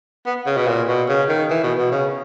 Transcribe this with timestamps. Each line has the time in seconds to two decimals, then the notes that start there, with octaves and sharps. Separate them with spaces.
0.26 B3
0.46 C#3
0.57 B2
0.67 A#2
0.88 B2
1.09 C#3
1.29 D#3
1.50 E3
1.63 B2
1.78 B2
1.92 C#3